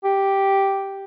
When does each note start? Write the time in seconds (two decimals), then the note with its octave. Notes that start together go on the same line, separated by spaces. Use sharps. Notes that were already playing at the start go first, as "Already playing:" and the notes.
0.04 G4